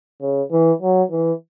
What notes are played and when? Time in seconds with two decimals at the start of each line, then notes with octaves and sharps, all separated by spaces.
0.21 C#3
0.51 E3
0.82 F#3
1.11 E3